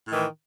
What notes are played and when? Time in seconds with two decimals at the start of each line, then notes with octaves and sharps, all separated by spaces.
0.07 A2
0.10 D#3
0.14 E3